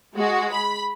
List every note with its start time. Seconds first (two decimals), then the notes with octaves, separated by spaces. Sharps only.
0.16 G#3 F#4
0.53 B5